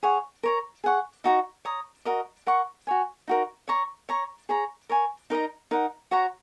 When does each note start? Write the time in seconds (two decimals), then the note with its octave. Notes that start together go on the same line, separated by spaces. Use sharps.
0.03 G#4 C#5 F#5
0.43 A#4 C#5 A#5
0.84 G#4 F#5 C#6
1.24 D#4 F#4 D#5 A#5
1.65 C#5 A#5 D#6
2.05 F#4 A#4 D#5
2.47 A#4 F#5 C#6
2.87 F#4 C#5 G#5
3.28 D#4 F#4 A#4
3.68 C#5 A#5 C#6
4.09 C#5 A#5 C#6
4.49 G#4 C#5 A#5
4.89 A#4 C#5 G#5
5.30 D#4 A#4 D#5 A#5
5.71 D#4 A#4 F#5
6.11 F#4 C#5 F#5 A#5